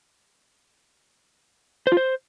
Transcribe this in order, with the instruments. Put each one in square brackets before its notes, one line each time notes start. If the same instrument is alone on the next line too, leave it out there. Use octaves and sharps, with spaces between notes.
[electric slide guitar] C5
F4
C5